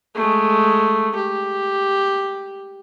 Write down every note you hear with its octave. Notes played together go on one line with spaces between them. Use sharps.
G#3 A3
G4